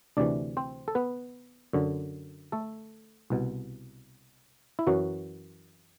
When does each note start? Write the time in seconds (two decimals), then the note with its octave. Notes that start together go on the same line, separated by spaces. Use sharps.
0.17 D2 C3 E3 D4 D5
0.57 C4 C5
0.88 A4
0.95 B3 B4
1.73 F#2 D3
2.52 A3 A4
3.30 C2 B2
4.79 E4
4.87 F#2 E3 F#3 F#4